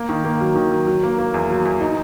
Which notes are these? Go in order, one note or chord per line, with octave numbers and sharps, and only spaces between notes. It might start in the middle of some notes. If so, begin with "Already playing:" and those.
Already playing: A#3
D#3
A#3
F#3
D#3
F#3
F#3
A#3
A#3
E2
F#3
E2
D#4